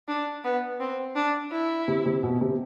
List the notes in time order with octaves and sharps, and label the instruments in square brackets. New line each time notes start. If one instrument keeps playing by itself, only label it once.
[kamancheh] D4
B3
C4
D4
E4
[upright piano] C3
C3
B2
C3